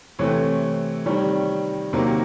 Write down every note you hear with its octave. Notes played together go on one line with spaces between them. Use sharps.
C3 E3 A3 C4 C#5
C3 D#3 G3 C#5
C3 D#3 F#3 A#3